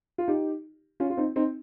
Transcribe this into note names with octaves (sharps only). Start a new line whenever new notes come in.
F4
D#4 G4
C#4 F4
F4
C4 D#4
C4 D#4